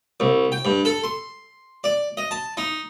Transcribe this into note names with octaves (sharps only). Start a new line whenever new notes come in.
C2
G5
G2
A4
C6
D5
D#5
A5
D#4